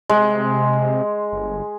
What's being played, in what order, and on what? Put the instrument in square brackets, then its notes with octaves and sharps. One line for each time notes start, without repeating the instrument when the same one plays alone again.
[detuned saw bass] C3 [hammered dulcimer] G#3
[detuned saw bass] G1